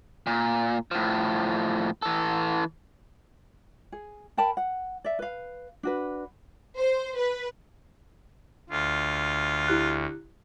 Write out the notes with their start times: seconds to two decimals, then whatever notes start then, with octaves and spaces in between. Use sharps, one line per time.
0.27 A#2
0.91 A2 F3
2.02 E3 A4
3.92 G#4
4.37 A#4 G5 A5 B5
4.57 F#5
5.04 D5 E5
5.19 B4 F5
5.83 D4 F#4 B4
6.76 C5
7.17 B4
8.70 D2 F4
9.68 E4 G4 F#6